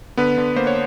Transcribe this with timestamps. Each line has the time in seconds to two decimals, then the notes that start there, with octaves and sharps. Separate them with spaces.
0.17 D3 B3 B4
0.38 D3
0.56 A#3 C5
0.67 C#5